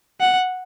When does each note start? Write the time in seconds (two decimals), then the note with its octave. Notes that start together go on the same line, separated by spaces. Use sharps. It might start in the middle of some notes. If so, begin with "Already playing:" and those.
0.20 F#5